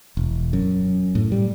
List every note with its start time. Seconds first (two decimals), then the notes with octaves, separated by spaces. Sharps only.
0.17 E1
0.53 F#2
1.15 A2
1.32 G3